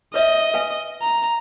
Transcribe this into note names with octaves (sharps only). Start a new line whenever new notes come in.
B4 C#5 D#5 E5
B4 F5 G#5
A#5